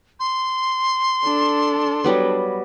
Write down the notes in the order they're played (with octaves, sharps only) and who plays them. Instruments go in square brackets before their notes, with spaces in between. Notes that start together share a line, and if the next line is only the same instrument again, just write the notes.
[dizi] C6
[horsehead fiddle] D4 A4
[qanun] F#3 G3 B3